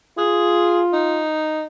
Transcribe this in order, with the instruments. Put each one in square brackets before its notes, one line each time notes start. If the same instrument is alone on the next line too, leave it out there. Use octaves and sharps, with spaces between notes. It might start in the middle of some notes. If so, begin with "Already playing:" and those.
[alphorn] F4 [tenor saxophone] G#4
[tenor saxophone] D#4